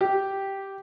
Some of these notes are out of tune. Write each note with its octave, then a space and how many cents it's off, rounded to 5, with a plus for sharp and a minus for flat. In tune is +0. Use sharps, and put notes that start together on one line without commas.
G4 -10